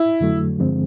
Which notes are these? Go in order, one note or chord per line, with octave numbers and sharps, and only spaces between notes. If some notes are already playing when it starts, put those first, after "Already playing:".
Already playing: E4
F2 D3 F#3 A3
G2 D3 F3 G#3 C4